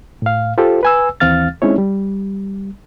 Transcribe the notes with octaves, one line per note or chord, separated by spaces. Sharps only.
A2 F5
F4 G4 A4 C5
B4 G#5 E6
D#2 E3 C4 F5 F6 A6
G#3 C4 C#4 D#4 E4 C#5
G3